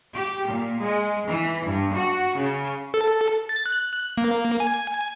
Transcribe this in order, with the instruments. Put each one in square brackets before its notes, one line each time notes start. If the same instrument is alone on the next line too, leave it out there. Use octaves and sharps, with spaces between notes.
[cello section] G4
A#2
G#3
E3
G2
F#4
C#3
[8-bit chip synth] A4
A6
F#6
A#3
G#5